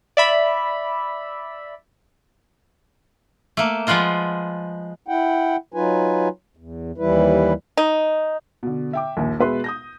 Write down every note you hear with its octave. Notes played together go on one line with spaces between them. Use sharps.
D5 E5 B5
A3 A#3
F3 G#3 B3 F4 D#5
E4 F#5 G5
F#3 D#4 F4 B4 G#5
E2
D#2 E3 G3 E4 B4
D#4
B2 D3
E5 G5 D6
A#1 D#2
B2 G#3 B4 E5 C6
D#6 G6 A#6